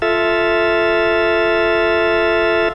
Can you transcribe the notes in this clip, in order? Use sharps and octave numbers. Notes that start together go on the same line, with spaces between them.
F4 A4 E5